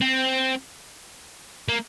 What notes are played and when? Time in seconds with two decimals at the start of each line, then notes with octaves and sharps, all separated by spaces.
0.01 C4
1.68 A#3